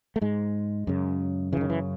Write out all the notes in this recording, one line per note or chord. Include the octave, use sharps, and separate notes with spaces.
A3
G#2 G#3
F#2 C#3
F#2 C#3 D#3 E3
E3